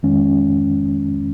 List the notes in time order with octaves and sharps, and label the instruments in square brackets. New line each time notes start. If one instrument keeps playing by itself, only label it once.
[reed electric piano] F2 D#3 G#3 C#4